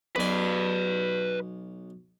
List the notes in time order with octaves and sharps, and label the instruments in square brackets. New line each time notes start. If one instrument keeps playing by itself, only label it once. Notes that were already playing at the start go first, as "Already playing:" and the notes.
[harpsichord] B1 G#5 [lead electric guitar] B4 D5